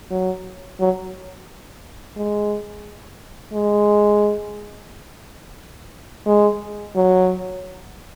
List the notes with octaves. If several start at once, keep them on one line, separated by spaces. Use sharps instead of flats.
F#3
F#3
G#3
G#3
G#3
F#3